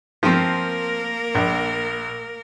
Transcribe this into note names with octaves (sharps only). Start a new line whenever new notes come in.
F3 A#3 C4 A#4
A#1